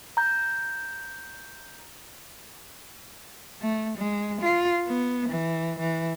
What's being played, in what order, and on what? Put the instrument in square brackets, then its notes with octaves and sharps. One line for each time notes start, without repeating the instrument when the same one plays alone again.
[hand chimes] A#5 G6
[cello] A3
G#3
F4
B3
E3
E3